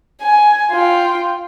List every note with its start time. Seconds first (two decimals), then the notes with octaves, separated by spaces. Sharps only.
0.22 G#5
0.72 F4 G5